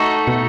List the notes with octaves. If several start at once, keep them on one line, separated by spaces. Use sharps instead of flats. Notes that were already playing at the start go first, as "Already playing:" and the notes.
Already playing: A3 D#4 F#4 A4
B2